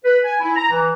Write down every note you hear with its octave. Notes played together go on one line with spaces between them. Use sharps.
B4
G#5
E4
A#5
E3